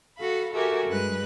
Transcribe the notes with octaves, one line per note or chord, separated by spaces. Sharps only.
F#4 A4 F5 B5
F#4 G4 A4 A#4 E5 G#5
G2 G#3 B4 F#6